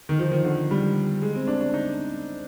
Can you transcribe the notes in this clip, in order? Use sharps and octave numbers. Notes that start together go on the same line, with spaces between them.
D#3
F3
D#3
D3
G3
G#3
C4
D4
D4
D#4